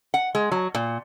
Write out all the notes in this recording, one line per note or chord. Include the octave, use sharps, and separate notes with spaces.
F#5
G#3
F#3
A#2